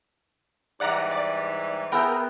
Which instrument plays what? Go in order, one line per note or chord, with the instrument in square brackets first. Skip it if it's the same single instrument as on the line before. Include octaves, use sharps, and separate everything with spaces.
[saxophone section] G#2 E3 G3 [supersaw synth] D5 F#5 A#5
[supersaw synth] D5
[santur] B3 G#4 E5 [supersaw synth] A#4 G5